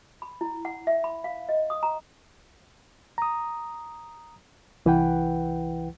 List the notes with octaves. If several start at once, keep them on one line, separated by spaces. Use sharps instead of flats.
B5
E4
F#5
E5
B5
F5
D#5
D#6
A#5
A#5 D#6
C2 E3 E4 B4 F#5 G5